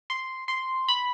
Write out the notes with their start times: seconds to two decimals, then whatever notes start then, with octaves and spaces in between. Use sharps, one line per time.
0.10 C6
0.48 C6
0.88 B5